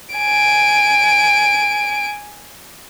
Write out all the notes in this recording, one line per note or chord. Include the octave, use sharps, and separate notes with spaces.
G#5 D7